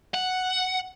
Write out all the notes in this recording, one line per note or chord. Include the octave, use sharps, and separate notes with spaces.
F#5